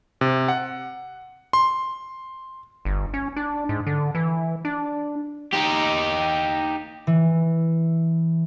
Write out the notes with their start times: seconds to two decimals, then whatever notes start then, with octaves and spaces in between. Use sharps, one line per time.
0.21 C3
0.48 F#5
1.53 C6
2.85 G1
3.14 C#4
3.36 D4
3.69 G#2
3.87 D3
4.15 E3
4.65 D4
5.53 D#4 G4
7.07 E3